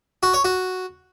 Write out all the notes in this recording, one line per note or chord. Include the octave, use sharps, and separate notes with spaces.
F#4
C#5
F#4